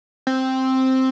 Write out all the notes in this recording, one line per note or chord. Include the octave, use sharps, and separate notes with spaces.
C4